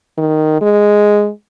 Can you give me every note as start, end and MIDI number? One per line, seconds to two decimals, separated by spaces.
0.18 0.57 51
0.61 1.29 56